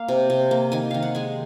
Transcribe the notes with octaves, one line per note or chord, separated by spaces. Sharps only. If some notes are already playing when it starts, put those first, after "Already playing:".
Already playing: A#3 F5
C3
C3
A#3
D#3 G#5
D#3 F5
F#5
G#3 G#5